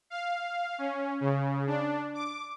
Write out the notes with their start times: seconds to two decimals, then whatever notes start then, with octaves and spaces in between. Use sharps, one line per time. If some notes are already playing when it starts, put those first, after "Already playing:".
0.10 F5
0.78 C#4
1.21 C#3
1.67 D4
2.14 D6